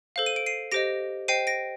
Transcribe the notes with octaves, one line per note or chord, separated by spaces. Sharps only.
A4 C5 F5
D#7
D7
C7 D#7
G4 C5 D#5 A#6 D7
C5 D#5 G5 C7 D#7
A#6 D7